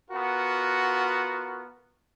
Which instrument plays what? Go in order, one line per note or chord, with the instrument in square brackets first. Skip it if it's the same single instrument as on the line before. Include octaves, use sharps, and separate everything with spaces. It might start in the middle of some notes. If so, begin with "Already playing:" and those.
[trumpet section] B3 F4 F#4 A#4